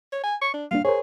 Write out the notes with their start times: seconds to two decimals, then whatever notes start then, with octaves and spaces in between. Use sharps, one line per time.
0.13 C#5
0.24 G#5
0.42 C#6
0.54 D4
0.71 G3 A#3 D4 F5
0.85 G#4 A#4 C5 C#5